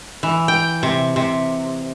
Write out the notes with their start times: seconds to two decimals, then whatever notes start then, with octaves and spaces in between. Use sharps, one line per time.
0.23 E3
0.48 G5
0.83 C3
1.16 C3